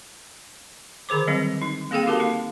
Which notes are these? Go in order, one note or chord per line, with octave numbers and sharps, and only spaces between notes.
D3 D#3 G#4 C5 D6
D#3 F#3 G3 C4
D#4
A#3 C4 G#4 A4 F5 G5
D#4 F#4 G4 A#4 A5
A#3 D#4